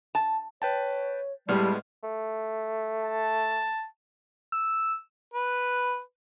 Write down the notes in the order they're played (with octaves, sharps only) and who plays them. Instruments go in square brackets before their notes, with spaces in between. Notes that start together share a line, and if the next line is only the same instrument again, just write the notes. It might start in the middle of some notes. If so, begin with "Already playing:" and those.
[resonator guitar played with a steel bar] A5
[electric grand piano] B4 G5 A5 [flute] C#5
[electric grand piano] A2 F6 [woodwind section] G3 [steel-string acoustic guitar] G#3 B3 [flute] A5
[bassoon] A3
[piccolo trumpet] A5
[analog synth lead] E6
[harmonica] B4